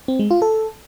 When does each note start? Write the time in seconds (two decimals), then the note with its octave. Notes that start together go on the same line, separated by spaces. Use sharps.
0.08 C4
0.19 G#3
0.31 F4
0.42 A4